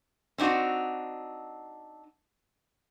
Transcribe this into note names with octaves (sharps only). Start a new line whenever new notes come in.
C4 D4 D#4 F#4